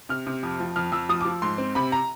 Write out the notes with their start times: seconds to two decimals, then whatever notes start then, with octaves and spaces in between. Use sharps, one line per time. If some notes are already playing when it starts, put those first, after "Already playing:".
0.09 C3 F6
0.27 C3
0.43 F2
0.60 F3
0.76 F2 F6
0.92 F2 E6
1.09 F3 D#6
1.21 F3 D6
1.42 G#2 C6
1.58 C4
1.75 C3 B5
1.92 A#5